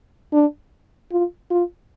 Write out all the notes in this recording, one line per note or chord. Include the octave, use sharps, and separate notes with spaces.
D4
F4
F4